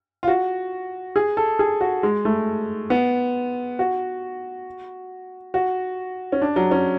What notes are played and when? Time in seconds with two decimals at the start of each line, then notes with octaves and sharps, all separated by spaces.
0.23 F4
0.28 F#4
1.16 G#4
1.37 A4
1.59 G#4
1.81 F#4
2.03 G#3
2.25 A3
2.90 B3
3.79 F#4
5.54 F#4
6.32 C#4
6.42 D4
6.56 F#3
6.71 C#4